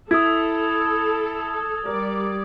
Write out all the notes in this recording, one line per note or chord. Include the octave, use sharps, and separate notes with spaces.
E4 A4 D#6 G#6
G3 A#4 D5